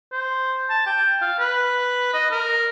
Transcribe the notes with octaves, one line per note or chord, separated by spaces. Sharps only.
C5
A5
G5
F5
B4
D#5
A#4